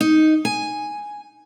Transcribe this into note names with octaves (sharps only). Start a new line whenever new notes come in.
D#4
G#5